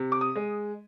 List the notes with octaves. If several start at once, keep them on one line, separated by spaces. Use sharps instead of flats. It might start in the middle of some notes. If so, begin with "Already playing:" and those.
Already playing: C3
D6
D#6
G#3